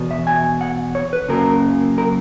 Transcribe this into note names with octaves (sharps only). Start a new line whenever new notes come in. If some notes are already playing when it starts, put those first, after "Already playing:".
Already playing: E2 B2
E5
G#5
F#5
C#5
B4
F#2 C#3 F#3 A#3 A#4
A#4